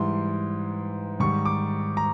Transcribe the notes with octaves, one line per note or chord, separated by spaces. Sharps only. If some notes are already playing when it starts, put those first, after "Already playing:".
Already playing: G#2 E3 G3 C6
G#2 D#3 G3 C#6
D6
A#5